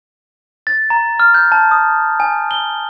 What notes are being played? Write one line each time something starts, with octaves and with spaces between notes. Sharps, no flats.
A6
A#5
F6
G6
A5
D#6
G#5
G7